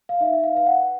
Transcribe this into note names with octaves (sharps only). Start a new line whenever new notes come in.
F5
D#4 E5
E5
F5
B4 F5
F#5